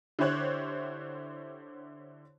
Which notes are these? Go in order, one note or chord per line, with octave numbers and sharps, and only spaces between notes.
D3 E4 G4 C5 C#5 F#6